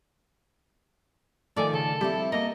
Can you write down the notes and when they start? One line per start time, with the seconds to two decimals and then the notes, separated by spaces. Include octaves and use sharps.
1.57 D#3 F3 A3 A4 D5 G#5
1.74 C#3 A4
2.01 F3 G3 C4 E4 G4
2.32 A#3 A#4 D#5 A#5